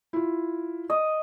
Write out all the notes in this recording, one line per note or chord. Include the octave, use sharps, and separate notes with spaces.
E4 F4
D#5